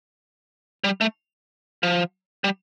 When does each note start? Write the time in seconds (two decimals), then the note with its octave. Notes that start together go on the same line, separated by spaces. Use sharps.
0.84 G3
1.01 A3
1.83 F3
2.44 G3